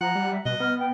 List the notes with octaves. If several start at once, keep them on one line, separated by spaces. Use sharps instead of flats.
F3 F#5 A#5
G3
E5
B2 D#5 F#6
B3 F6
G5